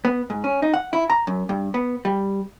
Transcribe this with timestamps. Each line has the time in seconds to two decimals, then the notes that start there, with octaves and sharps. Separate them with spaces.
0.05 B3
0.30 G#2
0.44 C#4
0.62 D#4
0.74 F#5
0.93 E4
1.10 A#5
1.27 F#2
1.49 G2
1.74 B3
2.05 G3